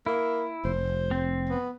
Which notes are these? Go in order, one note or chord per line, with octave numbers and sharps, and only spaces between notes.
A#3 E4
F1 C5
C4
B3